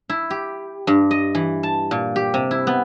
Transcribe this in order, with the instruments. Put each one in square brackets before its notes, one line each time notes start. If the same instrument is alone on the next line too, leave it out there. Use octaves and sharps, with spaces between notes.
[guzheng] E4
G4
G2
D#5
E3
A5
A#2
G4
C3
E4
B3